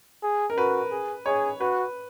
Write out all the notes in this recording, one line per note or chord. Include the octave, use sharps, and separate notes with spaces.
G#4
A#4
F#4 B4
G#4
G#4 C#5
F#4 B4